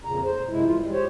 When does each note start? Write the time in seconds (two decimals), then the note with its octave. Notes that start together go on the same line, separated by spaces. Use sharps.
0.05 F2 A#2 C#3 A#5
0.23 C5
0.49 F#2 C3 G#3 E4
0.65 E3 F4
0.79 G3 G#3
0.92 G4 C5 C#5